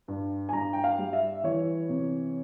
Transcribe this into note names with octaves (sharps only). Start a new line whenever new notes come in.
G2
G#5
G2 A#5
G5
F5
G3
E5
E3 C#5
C3